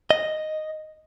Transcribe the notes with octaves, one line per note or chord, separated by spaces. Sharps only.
D#5